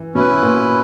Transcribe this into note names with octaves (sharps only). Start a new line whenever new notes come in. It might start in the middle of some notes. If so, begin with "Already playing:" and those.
Already playing: E3
B2 C#4 E4 B4
A#2